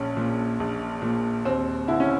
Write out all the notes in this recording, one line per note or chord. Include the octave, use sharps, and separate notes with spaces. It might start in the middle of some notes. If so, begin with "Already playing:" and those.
Already playing: A#1 C#4
A#2
A#1
A#2
D#2 C4
D3 E4
C#4